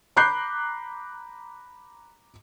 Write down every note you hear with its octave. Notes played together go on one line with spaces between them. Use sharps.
A#5 B5 D6 F#6 G6 C7